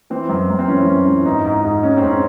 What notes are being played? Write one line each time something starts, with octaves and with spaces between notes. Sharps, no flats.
E3 C4
F#2
F#2
C4
E3 C#4
F#2
E3
G#2 D#4
G#2
G#2
G#2 C#4
C4
G#2
C#4